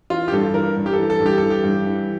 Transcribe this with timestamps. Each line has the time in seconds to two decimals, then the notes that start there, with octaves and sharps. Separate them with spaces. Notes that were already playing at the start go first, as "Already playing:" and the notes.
0.10 E3 F4
0.28 G4
0.32 G2 A4
0.54 E3 A#4
0.76 G2
0.86 G4
0.93 A4
0.99 E3
1.10 A4
1.20 G2
1.26 G4
1.38 E3 A4
1.50 G4
1.64 G2
1.86 E3